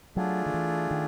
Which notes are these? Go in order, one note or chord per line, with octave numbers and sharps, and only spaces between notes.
F#3 A3 D4 F4 G#4
D#3
E3
D#3